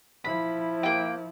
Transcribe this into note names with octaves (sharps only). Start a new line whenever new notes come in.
F3 E4 B5
A#3 G5